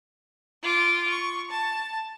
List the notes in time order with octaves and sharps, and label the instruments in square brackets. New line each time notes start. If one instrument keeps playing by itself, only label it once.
[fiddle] F4 D6
C#6
A5